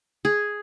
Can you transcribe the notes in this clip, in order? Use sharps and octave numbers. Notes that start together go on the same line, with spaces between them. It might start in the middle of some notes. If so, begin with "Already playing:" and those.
G#4